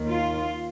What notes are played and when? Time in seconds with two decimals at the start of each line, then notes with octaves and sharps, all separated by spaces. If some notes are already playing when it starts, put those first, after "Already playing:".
Already playing: D#2 D#3
0.09 F4